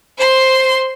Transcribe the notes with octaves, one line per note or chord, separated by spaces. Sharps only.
C5 C6